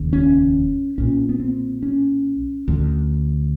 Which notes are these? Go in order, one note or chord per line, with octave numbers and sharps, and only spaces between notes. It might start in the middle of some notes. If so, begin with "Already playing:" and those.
Already playing: F1 D#2 C#3
C#4
B1 A#2 C#4
B3
C4
C#4
D2 D3